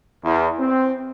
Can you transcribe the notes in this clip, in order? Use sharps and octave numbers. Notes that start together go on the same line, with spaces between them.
E2
C4